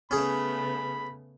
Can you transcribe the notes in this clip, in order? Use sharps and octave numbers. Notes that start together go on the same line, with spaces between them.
C#3 A3 B3 C#4 G#4 B5